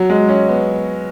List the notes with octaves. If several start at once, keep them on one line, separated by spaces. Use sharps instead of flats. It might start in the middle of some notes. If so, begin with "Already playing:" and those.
Already playing: F#3
G#3
C#4
B3